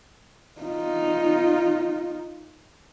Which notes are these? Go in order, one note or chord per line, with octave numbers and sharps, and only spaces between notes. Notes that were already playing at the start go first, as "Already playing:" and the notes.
D#4 F4